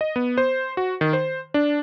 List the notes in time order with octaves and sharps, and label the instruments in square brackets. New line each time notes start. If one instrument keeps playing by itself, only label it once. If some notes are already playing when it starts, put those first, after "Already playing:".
[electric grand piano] D#5
B3
C5
F#4
D#3
C5
D4